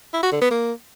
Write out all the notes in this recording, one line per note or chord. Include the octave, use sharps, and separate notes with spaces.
E4
F#4
D3
B3
A#3